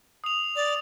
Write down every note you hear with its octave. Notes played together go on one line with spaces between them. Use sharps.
D#6 F7
D5